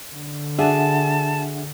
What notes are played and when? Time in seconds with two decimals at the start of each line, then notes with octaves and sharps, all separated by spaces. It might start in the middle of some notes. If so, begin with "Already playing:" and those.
0.11 D3
0.59 D4 F#4 G#4 E5 F#5 A5